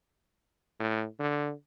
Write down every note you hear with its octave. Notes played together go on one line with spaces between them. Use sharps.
A2
D3